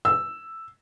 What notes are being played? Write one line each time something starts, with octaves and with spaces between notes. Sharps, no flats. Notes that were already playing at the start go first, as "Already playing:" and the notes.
E6